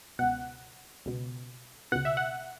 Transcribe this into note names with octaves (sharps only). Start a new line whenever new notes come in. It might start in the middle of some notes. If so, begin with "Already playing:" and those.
C#2 B2 F#5
C#2 B2
C#2 B2 F#5
E5
F#5